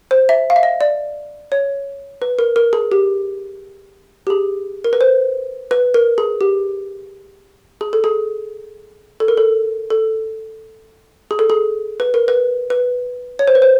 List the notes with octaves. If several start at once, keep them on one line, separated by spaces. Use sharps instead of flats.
C5
E5
F5
E5
D#5
D5
C#5
B4
A#4
A#4
G#4
G4
G4
G#4
A#4
B4
C5
B4
A#4
G#4
G4
G#4
A4
G#4
A4
A#4
A4
A4
G#4
A4
G#4
B4
A#4
B4
B4
C#5
C5
B4
C5